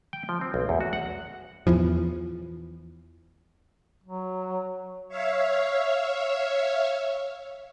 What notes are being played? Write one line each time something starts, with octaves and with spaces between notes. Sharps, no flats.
G5
F3
C4
B1
E2
F#4
F#5
E2 E3 F3
F#3
C#5 E5 F5